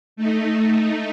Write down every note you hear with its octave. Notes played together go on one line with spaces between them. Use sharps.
A3 D#4